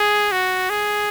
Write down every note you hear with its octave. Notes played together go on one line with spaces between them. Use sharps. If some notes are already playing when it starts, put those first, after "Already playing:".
Already playing: G#4
F#4
G#4